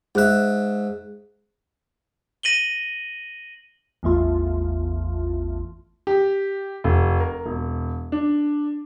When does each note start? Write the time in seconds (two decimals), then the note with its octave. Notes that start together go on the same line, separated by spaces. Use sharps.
0.15 G#2 G#4 E5 F#6
2.43 A#6 D#7 F#7 G7
4.03 A1 E2 A3 F4
6.07 G4
6.84 F1
7.20 A#4
7.46 E1
8.12 D4